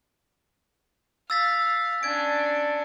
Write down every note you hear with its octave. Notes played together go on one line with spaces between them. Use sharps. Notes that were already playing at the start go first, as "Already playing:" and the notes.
F5 E6 A6 B6
C#4 D4 G#6 D7